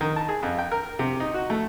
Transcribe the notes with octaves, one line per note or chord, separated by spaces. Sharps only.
D#3
A5
G#4
F2
G5
A#4
C3
D#4
F#4
A3